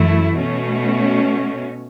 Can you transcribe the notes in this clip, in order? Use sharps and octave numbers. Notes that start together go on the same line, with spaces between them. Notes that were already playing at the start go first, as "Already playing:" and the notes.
Already playing: F#2 E3 A3 E4
B2 A3 C#4